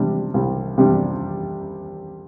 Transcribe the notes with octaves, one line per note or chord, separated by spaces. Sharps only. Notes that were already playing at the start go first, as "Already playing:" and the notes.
Already playing: C3 G3 D4
C2
C3 G3 D4